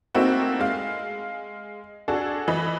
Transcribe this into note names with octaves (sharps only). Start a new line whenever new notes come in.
A3 A#3 C4 D#4 E4 F#4
G#3 F5
D4 F#4 G#4 A4
E3 D#5 B5